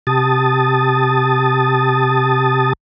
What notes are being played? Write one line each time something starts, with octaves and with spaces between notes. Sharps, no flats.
C3 G4 A5 D#6 A6